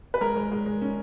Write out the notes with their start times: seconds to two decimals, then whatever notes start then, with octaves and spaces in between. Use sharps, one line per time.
0.14 B4
0.21 G#3 A#4
0.36 G#3
0.52 G#3
0.66 G#3
0.81 C#4